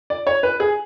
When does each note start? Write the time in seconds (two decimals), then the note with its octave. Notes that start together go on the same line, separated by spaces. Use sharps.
0.10 D5
0.27 C#5
0.43 B4
0.60 G#4